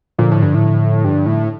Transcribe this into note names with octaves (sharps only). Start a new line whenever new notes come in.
A#2 D3 F3
A2
G2
A2
G2
A2